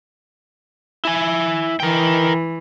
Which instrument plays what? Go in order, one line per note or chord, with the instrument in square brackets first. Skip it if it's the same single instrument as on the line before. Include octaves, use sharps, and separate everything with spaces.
[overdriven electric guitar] E4 G#5
[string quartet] E3 [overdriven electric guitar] A#4 G5